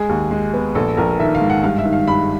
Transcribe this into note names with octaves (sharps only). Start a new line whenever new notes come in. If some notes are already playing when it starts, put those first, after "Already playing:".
Already playing: G#3 G#4
D#2
G#3
B3
A#1 A4
A#1 A#4
D#3 E5
F5
G#2
F#5
G2 F5
E5
D#3
F5
G2 B5